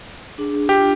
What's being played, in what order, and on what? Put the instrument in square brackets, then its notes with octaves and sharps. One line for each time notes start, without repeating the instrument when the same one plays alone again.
[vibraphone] D4 G#4
[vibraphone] D4 F4 [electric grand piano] G4